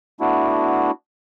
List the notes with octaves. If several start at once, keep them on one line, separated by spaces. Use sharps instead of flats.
A3 B3 D4 E4 F#4